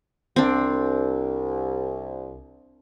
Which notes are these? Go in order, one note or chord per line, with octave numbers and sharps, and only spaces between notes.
C2 C4 D4